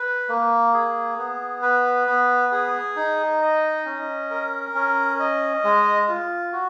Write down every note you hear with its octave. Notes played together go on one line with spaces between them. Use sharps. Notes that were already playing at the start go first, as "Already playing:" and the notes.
Already playing: B4
A#3
G#4
B3
B4
B3
G#4
D#4
D#5
C#4
A#4
C#4
D#5
G#3
F4
F#4